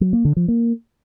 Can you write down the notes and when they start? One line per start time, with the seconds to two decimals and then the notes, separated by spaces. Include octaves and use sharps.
0.01 F#3
0.13 A#3
0.25 D3
0.37 F3
0.48 A#3